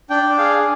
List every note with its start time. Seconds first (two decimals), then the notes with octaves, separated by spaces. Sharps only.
0.10 D4 G5
0.38 G#4 F5